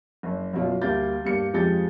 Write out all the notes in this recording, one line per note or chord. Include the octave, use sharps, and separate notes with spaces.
F#1
F#1 B2 F4
D2 G3 A#3 G6 A6
G2 A#3 C#7
F2 F3 G#3 G4 G6 A6